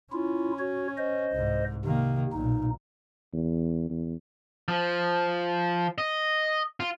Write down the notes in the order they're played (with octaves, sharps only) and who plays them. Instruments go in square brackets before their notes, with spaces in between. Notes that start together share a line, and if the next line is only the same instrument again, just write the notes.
[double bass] C#4 [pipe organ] E4 F4
[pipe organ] F#4 C#5
C5 D#5
[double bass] C2 G#2
[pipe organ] C3 [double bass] D#3 A#3
[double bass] B1 A#2 [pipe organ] D#4
[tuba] E2
E2
[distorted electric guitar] F3
D#5
F4